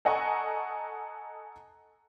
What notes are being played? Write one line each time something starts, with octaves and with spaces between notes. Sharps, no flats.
A4 D#5 F#5 G#5 A#5 C#6